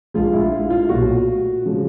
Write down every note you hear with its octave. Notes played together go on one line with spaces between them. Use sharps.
A#1 A#2 F3 G#3 F4
E4
F4
F4
B1 A#2 F#3 A3 F#4
C#3 F3 G#3